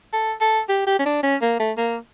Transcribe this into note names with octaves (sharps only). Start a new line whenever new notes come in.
A4
A4
G4
G4
C#4
D4
C#4
A#3
A3
A#3